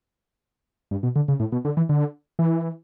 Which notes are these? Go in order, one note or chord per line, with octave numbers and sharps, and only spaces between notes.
G2
B2
D3
C#3
A2
B2
D3
E3
D3
E3